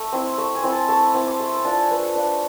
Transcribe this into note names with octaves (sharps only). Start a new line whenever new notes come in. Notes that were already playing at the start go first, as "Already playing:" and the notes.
Already playing: A3
C4 E4
A3
G#5
C4 E4
A5
A3 A5
B5
C4 E4 D6
D6
A3 C6
B5
D4 F4 A5
G#5
A3 B4
A4
D4 F4 B4